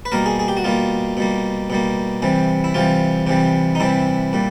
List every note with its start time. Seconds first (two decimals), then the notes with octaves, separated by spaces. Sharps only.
0.05 B4
0.12 B2 G3 A#3 A#4
0.26 G#4
0.39 G#4
0.48 G4
0.57 F#4
0.64 B2 G3 A#3 F4
1.17 B2 G3 A#3
1.70 B2 G3 A#3
2.22 C3 E3 G3
2.64 E4
2.74 C3 E3 G3 F4
3.27 C3 E3 G3
3.75 D#4
3.80 C3 E3 G3 E4
4.33 A#2 G3